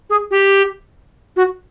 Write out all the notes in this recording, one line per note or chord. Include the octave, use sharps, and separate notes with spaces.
G#4
G4
F#4